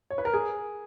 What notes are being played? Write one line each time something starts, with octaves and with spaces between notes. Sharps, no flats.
C#5
B4
A#4
G#4